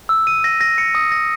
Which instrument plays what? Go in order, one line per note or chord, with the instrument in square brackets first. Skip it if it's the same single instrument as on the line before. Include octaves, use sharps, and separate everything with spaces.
[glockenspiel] E6
D#7
A#6
A#6
C#7
D#6
A#6